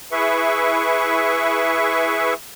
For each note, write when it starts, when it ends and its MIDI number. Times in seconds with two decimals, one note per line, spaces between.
0.12 2.34 64
0.12 2.34 68
0.12 2.34 71
0.12 2.34 76
0.12 2.34 85